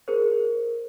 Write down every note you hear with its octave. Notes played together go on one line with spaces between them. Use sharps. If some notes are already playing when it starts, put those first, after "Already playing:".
G#4 A#4 C5